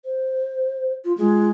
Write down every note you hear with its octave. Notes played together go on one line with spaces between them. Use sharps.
C5
F4
G#3 F4